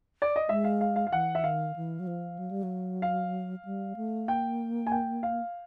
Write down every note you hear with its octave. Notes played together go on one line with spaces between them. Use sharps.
D5
D#5
G#3 E5
F5
F5
F5
F5
E3 F#5
E5
D#3 F5
E3
F#3
F3
F#3
G3
F#3
F5
G3
A3
A#3 G5
G#5
G5
F5